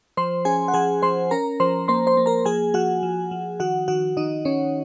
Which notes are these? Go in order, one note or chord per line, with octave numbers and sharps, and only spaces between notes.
F3 C5 C6
C#4 G#4 G#5
F#5
F3 G#4 G#5
F3 C5 C6
C#4 A#4 A#5
F3 C5 C6
A#3 C5 C6
C5 C6
A#3
A#4 A#5
F3 G#4 G#5
F3 F#4 F#5
F3
F3
D#3 F#4 F#5
D#3 F#4 F#5
D#3 D#4 D#5
D#3 C#4 C#5